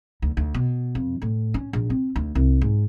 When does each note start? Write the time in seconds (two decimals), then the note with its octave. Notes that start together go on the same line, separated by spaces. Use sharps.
0.22 D2
0.37 D2
0.54 B2
0.95 F2
1.22 A2
1.54 C#4
1.73 A#1
1.90 C4
2.16 D2
2.35 C2
2.61 G#2